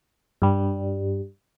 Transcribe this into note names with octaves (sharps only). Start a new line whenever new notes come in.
G2 G3